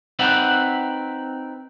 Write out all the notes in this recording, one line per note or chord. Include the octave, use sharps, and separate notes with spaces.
C4 D#4 B4 D5 E5 F#5